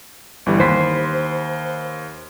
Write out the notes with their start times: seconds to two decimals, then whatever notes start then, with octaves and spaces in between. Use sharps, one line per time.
0.46 G1 E3 G3
0.60 D#2 C5 B5 B6